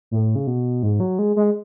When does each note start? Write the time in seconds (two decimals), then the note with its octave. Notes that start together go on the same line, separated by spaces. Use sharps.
0.11 A2
0.35 C#3
0.47 B2
0.83 G#2
1.00 F#3
1.19 G#3
1.36 G#3